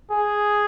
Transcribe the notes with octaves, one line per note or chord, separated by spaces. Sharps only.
G#4